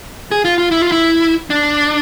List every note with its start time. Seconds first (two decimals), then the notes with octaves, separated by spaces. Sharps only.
0.32 G#4
0.45 F4
0.58 F4
0.71 E4
0.82 F4
0.92 E4
1.50 D4